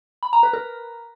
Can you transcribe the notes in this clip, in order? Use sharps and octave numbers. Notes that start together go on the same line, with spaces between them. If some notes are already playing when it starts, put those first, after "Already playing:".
B5
A#5
B4
A#4